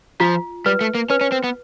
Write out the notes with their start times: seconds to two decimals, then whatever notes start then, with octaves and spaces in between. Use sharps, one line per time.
0.20 F3 F4
0.66 G3 B4
0.81 A3
0.95 A#3
1.10 C#4 B4
1.21 C#4
1.32 C4
1.44 B3